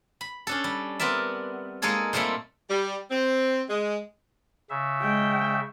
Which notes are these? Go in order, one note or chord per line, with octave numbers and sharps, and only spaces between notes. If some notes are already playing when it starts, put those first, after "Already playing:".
B5
C#4 D4 A4
G3
B3 C4 A#4 D5 E5
G#3 A#3 D#4 G#4 A4 C#5
A#2 G3 A3 A#3 C4 A4
G3
C4
G#3
C#3 E5
G#3 G5